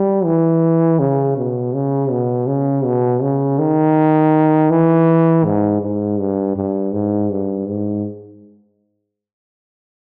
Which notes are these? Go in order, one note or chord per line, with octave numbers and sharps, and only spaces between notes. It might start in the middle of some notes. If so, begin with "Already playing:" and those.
Already playing: G3
E3
C#3
B2
C#3
B2
C#3
B2
C#3
D#3
E3
G#2
G#2
G2
G2
G#2
G2
G#2